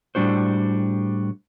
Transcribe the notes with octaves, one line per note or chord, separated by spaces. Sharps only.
A2 G3 D4 F#4 C5